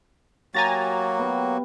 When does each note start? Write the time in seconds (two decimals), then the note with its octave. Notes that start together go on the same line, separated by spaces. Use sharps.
0.54 F#3 A#3 F#4 G4 G#5 A#5 A6
1.19 B3 F4 G4